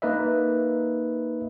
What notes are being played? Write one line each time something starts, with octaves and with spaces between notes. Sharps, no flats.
A#3 D#4 B4 D#5 E5